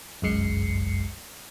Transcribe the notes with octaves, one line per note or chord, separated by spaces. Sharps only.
G1 C2 F#2 G#3 C7 C#7